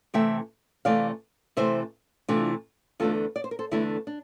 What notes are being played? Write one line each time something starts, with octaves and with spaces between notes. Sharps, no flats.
C3 E3 A3 E5 G5
C3 E3 A3 D5 F5
C3 E3 A3 C5 E5
C3 E3 A3 D4 F4
E2 D3 A3 D4 F4 A4
D5
C5
A#4
A4 C5
E2 D3 A3 D4 E4
D4